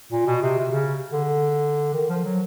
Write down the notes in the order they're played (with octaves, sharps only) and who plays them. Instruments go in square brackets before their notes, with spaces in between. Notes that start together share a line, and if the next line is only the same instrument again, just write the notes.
[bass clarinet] A#2
B2
C3
C3
C#3
D3
D#3
F3
F#3